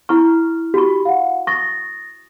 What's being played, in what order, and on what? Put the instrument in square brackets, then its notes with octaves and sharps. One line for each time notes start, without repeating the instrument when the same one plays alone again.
[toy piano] E4 C#6 [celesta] F6
[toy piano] F#4 C#6 [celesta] G4 B5
[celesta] F5 F#5
[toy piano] C#6 [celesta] D#6 A6 A#6